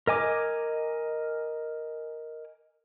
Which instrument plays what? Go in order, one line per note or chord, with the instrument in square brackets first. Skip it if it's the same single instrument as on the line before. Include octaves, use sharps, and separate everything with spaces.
[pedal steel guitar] A#4 D#5 G#5 D6